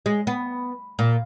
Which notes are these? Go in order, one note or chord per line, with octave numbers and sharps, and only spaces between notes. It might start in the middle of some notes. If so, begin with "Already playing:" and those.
G#3
B3
A#2